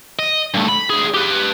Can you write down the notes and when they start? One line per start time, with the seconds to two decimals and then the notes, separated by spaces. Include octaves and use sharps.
0.19 D#5
0.54 G2 A3
0.68 B5
0.90 D2 G#4
1.14 G4 B4